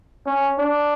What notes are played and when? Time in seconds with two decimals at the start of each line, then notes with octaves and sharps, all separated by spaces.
0.26 C#4
0.58 D4